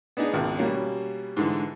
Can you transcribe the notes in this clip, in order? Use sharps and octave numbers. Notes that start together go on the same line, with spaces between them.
B3 D4 D#4 G#4
G#1 C#2
B2 G3 A#3 C#4
G#2 D3 E3